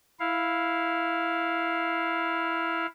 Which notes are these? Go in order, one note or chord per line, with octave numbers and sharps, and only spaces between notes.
E4 F5